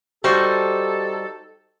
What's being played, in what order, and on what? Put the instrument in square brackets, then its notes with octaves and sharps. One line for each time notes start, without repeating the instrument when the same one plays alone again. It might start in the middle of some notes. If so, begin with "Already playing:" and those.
[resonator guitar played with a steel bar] G3 F#4 C5 [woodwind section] D#4 G4 A4